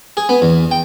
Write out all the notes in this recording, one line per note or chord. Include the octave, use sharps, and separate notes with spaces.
G#4
B3
E2
G5